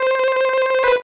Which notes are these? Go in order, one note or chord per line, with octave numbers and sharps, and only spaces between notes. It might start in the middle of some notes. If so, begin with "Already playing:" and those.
Already playing: C5
B4